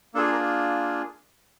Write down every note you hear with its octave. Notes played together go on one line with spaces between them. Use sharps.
A#3 D4 F4 G#4 A4
A#4